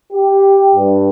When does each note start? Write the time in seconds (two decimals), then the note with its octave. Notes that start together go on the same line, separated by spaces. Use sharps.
0.13 G4
0.74 G2